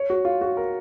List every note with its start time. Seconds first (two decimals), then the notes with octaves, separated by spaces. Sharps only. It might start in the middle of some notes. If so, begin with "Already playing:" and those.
Already playing: C#5
0.10 F#4
0.25 F4
0.41 F#4
0.57 A#4